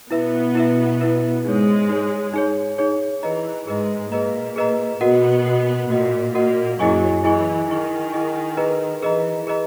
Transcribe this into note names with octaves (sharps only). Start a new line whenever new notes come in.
B2 B3 E4 B4 E5
E4 B4 E5
E4 B4 E5
G#2 G#3 D#4 G#4 C#5
D#4 G#4 C#5
D#4 G#4 C#5
D#4 G#4 C#5
E3 G#4 B4 D#5 A#5
G#2 G#3 G#4 B4 D#5 A#5
A#2 A#3 G#4 B4 D#5 A#5
G#4 B4 D#5 A#5
B2 B3 F#4 A#4 D#5 F#5
F#4 A#4 D#5 F#5
A#2 A#3 F#4 A#4 D#5 F#5
A#2 A#3 F#4 A#4 D#5 F#5
F#2 F#3 E4 G#4 D#5 G#5 C#6
E3 E4 G#4 D#5 G#5 C#6
D#3 E4 G#4 D#5 G#5 C#6
E4 G#4 D#5 G#5 C#6
G#4 B4 D#5 A#5
E3 G#4 B4 D#5 A#5
G#4 B4 D#5 A#5